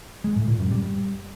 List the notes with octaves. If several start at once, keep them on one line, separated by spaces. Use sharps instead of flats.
G#3
A2
A#2
F#2
G3